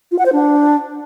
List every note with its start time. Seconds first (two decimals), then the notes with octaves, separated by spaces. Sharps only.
0.11 F4
0.18 F#5
0.25 C5
0.33 D4